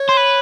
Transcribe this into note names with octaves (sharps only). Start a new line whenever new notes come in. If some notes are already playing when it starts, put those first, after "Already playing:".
Already playing: C#5
C5
B4